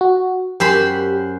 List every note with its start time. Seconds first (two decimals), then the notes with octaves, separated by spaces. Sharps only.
0.01 F#4
0.60 F#2 G4 C5 B5